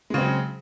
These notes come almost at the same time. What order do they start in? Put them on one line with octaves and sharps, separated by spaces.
G#3 C#3 C4 F#3